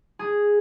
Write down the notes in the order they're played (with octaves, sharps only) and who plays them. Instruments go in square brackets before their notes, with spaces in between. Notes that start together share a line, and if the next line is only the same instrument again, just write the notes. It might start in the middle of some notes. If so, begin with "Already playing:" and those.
[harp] G#4